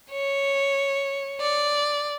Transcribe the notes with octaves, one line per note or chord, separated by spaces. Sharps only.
C#5
D5